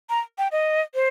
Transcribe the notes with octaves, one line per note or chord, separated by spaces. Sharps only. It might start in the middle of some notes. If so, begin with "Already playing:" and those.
A#5
G5
D#5
C5